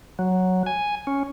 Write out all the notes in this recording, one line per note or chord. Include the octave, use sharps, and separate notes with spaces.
F#3
G#5
C#4